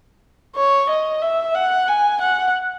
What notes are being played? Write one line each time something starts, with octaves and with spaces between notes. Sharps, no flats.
C#5
D#5
E5
F#5
G#5
F#5